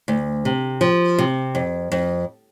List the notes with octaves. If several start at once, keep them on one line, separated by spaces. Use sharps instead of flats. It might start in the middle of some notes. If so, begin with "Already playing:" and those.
D2
C3
F3
C3
F2
F2